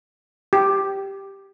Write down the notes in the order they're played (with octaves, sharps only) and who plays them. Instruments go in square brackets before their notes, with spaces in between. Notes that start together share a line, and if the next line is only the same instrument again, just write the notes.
[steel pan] G4